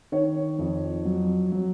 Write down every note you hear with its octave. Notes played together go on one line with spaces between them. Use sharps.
D#3 C#5
F2
F#3
F#3